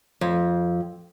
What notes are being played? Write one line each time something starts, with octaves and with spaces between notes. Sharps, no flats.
F2